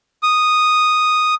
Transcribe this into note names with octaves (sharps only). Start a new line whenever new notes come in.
D#6